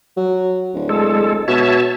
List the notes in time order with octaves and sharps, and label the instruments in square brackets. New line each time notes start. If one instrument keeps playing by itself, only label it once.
[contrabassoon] F#3
D1
[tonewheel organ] G#3 A4
[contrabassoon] B2 [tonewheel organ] C#5 E5 A5